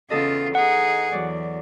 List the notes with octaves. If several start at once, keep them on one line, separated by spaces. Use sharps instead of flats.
E2 C#3 F4 A4 D#5
D#4 G#4 F#5
E2 F#3 D5